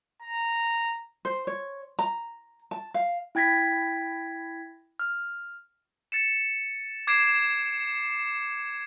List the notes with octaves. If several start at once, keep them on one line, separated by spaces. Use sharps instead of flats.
A#5
C5
C#5
A#5
A5
F5
E4 G5 G#6 A#6 B6
F6
A6 C#7 E7
D6 G#6 C7 D7 E7